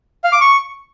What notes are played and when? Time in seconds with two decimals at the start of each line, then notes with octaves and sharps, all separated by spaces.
0.24 F5
0.32 D6
0.41 C#6